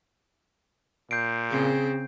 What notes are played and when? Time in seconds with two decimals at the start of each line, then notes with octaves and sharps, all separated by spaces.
1.11 A#2 G6 C7 D7
1.50 C#3 C4 G#4